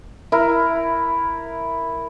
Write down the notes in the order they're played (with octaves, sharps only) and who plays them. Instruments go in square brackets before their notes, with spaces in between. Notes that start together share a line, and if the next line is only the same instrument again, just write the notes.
[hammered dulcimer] E4 A#4